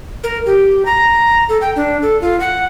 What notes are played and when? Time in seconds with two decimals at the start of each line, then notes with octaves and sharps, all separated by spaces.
0.24 A#4
0.46 G4
0.85 A#5
1.49 A4
1.61 G5
1.76 D4
2.02 A4
2.21 F4
2.40 F#5